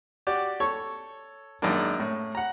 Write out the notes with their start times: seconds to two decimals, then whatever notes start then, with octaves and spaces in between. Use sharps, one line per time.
0.27 F#4 G4 D5
0.60 A4 C#5 C#6
1.62 F#2 D#3 G#3 A#3 D4
2.00 A2
2.35 F#5 A#5